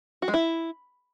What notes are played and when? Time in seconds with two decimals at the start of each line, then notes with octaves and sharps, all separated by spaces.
0.22 F#4
0.28 G#3
0.34 E4